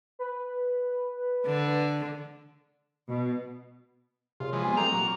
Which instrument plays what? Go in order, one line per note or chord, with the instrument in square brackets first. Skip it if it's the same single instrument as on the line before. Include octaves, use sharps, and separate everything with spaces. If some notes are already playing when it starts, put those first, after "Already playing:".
[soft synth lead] B4
[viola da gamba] D3
[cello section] B2
[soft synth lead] C3 [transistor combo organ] F4 [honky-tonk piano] G#4 C#5
[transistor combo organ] E3 F3 G#3
[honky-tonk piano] A#1 E2 G2 [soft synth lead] G#5
[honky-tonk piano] C3 A3 [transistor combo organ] G5 C6 D6 [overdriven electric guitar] A#5
[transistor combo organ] A#2 F#4 [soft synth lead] F#3